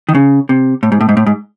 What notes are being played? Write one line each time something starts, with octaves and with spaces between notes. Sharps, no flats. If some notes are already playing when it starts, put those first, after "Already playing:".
D#3
C#3
C3
A2
G#2
A2
G#2
A2
G#2